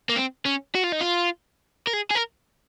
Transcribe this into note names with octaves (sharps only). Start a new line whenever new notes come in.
A#3
C4
C#4
F#4
F4
D#4
F4
A#4
G#4
G#4
A#4